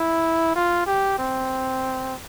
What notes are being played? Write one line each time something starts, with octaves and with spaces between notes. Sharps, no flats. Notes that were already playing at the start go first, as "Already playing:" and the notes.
Already playing: E4
F4
G4
C4